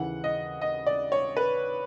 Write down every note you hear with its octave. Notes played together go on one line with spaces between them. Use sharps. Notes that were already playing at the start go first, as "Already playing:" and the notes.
Already playing: D#2 C#3 E3 F#5
D#5
D#5
D5
C#5
B4